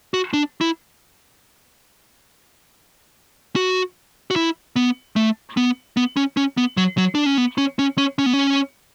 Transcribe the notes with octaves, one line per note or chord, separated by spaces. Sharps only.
F#4
D4
E4
F#4
F#4
E4
B3
A3
B3
B3
C#4
C#4
B3
F#3
F#3
D4
C#4
B3
C#4
C#4
C#4
C#4
B3
C#4